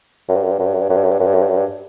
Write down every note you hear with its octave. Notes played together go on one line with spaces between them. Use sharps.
F#2
G2
F#2
G2
F#2
G2
F#2
G2
F#2
G2
F#2
G2
F#2
G2
F#2
G2
F#2
G2